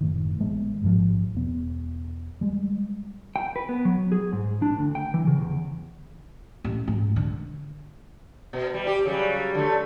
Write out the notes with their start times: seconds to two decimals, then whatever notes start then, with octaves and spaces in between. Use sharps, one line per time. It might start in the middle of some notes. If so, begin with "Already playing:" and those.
0.01 F#1 A2 D#3
0.39 A1 G#3 B3
0.82 A1 G#2 F3
1.35 E1 B3
2.41 G3 G#3
3.36 G5
3.56 B4
3.69 B3
3.85 F#3
4.12 G#4
4.32 G#2
4.62 D4
4.78 D2
4.95 G5
5.14 E3
5.27 C#3
5.42 E2
6.64 A1
6.88 G#2
7.16 D3
8.53 B2
8.74 G3
8.87 G4
9.05 C#3 F#3 G3
9.54 D3 A3